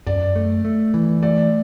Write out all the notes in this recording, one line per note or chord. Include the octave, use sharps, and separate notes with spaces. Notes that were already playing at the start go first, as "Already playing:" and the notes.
F#2 D5
A3
A3
E3
A3 D5